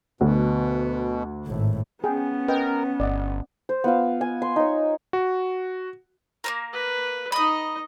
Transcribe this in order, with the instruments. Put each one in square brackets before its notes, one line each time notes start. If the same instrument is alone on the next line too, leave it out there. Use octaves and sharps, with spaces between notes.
[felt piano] D2 [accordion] B2
[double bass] G#1 A2
[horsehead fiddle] B3 C#4 [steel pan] G#4 G5
[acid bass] A#4 [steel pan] B4 D#5 G5
[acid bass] G1 [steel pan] D5 D#5 F#5
[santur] C5
B3 F4 F5
G#5
C6
D#4 C#5
[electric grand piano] F#4
[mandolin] A#3 C4 A#4
[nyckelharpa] B4
[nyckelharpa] D#4 D#5 [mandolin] B5 D#6